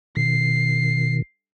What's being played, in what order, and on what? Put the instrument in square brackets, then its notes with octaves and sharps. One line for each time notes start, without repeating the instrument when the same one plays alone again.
[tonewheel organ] B2 D#3 [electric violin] C7